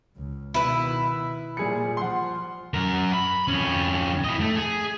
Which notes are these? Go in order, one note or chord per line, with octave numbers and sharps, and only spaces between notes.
C#2
B2 D#3 E4 B4
A#2 F3 G3 G#4 C#7
F3 F#5 C6
F#2 A#4
B5
F2 C#4
E4 D#5
A3
G#4